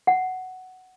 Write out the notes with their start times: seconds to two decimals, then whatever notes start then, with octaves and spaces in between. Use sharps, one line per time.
0.07 F#5